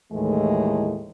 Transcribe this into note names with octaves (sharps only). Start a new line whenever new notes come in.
D#2 A2 E3 G#3 A3